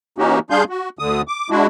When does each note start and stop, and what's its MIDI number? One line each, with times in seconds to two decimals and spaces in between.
0.18 0.39 52
0.18 0.39 58
0.18 0.39 61
0.18 0.39 63
0.18 0.39 66
0.18 0.39 67
0.50 0.64 55
0.50 0.64 62
0.50 0.64 68
0.50 0.64 77
0.50 0.64 84
0.50 0.64 91
0.69 0.89 66
0.99 1.22 38
0.99 1.22 50
0.99 1.22 87
1.28 1.50 86
1.50 1.67 56
1.50 1.67 62
1.50 1.67 64
1.50 1.67 66